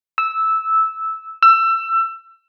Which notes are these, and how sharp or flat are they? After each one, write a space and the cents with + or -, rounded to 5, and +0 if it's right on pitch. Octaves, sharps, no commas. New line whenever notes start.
E6 -10
E6 +25